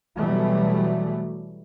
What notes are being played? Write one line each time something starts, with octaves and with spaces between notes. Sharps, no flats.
B2 E3 F#3 G3 A3